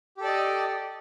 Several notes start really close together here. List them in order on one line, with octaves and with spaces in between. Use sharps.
G4 A4 D5 D#5